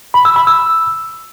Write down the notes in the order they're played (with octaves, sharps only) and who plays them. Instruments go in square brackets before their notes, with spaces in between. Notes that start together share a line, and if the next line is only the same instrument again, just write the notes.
[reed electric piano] B5
E6
B5
E6